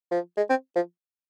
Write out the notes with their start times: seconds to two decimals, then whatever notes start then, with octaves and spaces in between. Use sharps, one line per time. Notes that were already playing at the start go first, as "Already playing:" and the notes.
0.11 F3
0.37 G#3
0.50 C4
0.76 F3